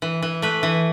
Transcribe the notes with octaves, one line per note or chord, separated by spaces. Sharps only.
E3
E3
A3 B4
E3